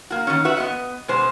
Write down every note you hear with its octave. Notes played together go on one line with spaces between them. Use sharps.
A#3 F#4
D#3 C#4
F#4 B4 E5
B3 D#5
B2 G#3 C5